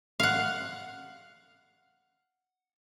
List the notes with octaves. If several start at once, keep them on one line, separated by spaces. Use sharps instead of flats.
F5 F#5